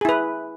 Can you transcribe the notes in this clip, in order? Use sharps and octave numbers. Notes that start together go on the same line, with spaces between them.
E4 G#4 B4